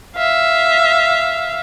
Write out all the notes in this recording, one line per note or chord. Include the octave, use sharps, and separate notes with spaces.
E5 F5